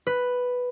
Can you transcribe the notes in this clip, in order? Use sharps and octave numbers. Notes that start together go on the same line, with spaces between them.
B4